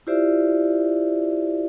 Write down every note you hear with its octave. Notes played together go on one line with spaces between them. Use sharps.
E4 F4 G4 C5 D5 E5